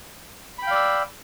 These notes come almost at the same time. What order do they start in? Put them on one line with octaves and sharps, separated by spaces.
B5 G5 F5 D5 E6